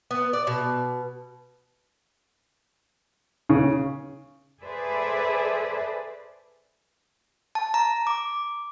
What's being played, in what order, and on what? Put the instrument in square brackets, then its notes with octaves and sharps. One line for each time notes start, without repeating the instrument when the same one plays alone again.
[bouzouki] B3
D5
B2
[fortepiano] C#3
[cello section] G#4 A4 B4 C5 D5 E5
[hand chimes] A5
A#5
D6